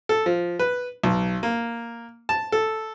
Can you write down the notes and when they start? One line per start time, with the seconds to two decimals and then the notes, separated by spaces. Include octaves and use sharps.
0.09 A4
0.26 F3
0.59 B4
1.04 B1
1.43 A#3
2.29 A5
2.52 A4